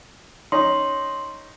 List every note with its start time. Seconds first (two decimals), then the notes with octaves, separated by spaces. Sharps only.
0.52 C#4 D#4 C6